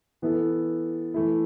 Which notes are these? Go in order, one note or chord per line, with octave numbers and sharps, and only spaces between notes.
E3 B3 E4 A4
E3 A3 E4